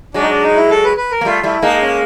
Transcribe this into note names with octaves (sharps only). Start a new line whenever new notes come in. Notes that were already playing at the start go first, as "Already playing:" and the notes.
F#3 G#3 D4
D#4
D4
D#4
E4
A4
B4
B4
A#4
A#3
G3 A3 F4
G3 A3 E4
G#3 A#3 D#4
C#4